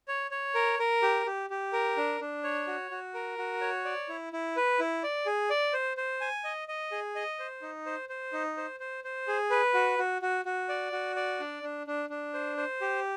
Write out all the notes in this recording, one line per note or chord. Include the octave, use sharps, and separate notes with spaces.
C#5
C#5
A#4
A#4
G4
G4
G4
A#4
D4
D4
C#5
F#4
F#4
A#4
F#4
C#5
D5
E4
E4
B4
E4
D5
G#4
D5
C5
C5
G#5
D#5
D#5
G#4
D#5
C5
D#4
C5
C5
D#4
C5
C5
C5
G#4
B4
F#4
F#4
F#4
F#4
D5
F#4
D5
D4
D4
D4
D4
C5
C5
G4